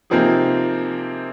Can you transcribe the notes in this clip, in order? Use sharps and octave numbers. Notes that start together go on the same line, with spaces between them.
C3 F3 A#3 C4 D#4 G#4